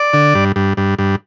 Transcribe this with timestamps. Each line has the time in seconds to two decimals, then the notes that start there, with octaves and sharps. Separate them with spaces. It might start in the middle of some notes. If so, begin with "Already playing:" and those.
Already playing: D5
0.13 D3
0.35 G2
0.56 G2
0.77 G2
0.99 G2